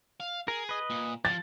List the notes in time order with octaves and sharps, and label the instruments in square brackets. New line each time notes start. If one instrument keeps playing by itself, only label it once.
[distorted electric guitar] F5
[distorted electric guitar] G#4 [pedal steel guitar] A#4
[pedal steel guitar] B4 D#5
[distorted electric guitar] A#2
[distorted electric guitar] F3 [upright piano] A6